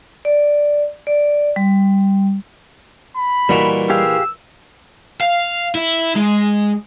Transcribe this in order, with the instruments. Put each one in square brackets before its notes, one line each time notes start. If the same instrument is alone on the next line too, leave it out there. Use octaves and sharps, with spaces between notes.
[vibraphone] D5
D5
G3
[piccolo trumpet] B5
[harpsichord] A#2 E3 [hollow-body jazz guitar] G3 D#4 F#4
[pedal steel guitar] G4 G#4 F5 [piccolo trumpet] E6
[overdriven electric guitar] F5
E4
G#3